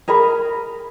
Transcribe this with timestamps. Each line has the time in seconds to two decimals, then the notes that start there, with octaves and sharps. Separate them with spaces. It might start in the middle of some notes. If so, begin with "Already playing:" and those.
0.08 G#4 A#4 A#5 B5